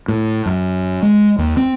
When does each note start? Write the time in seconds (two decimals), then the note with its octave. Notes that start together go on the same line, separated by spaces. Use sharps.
0.08 A2
0.46 F#2
1.03 G#3
1.38 D#2
1.57 C4